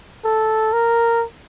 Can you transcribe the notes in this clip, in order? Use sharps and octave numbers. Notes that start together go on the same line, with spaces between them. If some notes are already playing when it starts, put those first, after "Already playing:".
A4
A#4